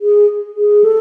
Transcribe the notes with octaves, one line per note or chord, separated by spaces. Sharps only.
G#4
G#4
A4